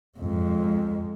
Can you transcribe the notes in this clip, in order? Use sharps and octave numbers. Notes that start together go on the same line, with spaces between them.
F2 G#3